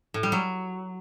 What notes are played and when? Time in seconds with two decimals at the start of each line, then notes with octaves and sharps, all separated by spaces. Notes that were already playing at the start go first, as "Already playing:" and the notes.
0.14 A2
0.23 G3
0.32 F#3